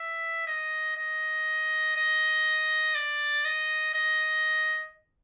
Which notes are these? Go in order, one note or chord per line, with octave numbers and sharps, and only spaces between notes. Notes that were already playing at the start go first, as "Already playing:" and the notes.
Already playing: E5
D#5
D#5
D#5
D5
D#5
D#5